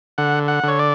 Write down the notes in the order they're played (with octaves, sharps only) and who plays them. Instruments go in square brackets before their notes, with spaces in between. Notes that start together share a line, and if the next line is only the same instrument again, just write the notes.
[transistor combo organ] D3 F#5
F#5
D3 C#5
D5